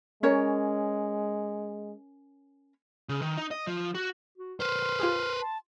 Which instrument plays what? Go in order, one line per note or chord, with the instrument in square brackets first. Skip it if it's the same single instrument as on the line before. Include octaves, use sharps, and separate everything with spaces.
[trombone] G#3 [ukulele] C#4 A#4 C#5
[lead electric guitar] C#3
D#3
D#4
D#5
F3
F#4
[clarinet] F#4
[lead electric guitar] B4 C5 [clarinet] C6 [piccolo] F6
[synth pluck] F4 G4 G#4
[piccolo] A5